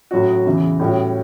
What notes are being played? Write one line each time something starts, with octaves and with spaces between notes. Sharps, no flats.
A2 F#3 C#4 F#4
E2 C#3 E3
A2 G3 C#4 F#4